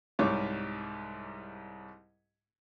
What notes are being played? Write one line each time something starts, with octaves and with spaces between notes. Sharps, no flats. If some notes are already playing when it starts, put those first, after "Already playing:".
C2 G#2 G3 C#5 D6